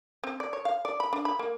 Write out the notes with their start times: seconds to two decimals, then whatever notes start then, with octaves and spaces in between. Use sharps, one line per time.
0.24 C4
0.40 D5
0.53 C#5
0.65 F5
0.85 D5
1.00 B5
1.13 D4
1.25 B5
1.39 A#3